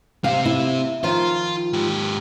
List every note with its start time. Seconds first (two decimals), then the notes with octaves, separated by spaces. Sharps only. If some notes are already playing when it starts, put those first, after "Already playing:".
0.24 C3 C4 F5
0.45 E4
1.03 D#3 F3 F4
1.73 G#2 G4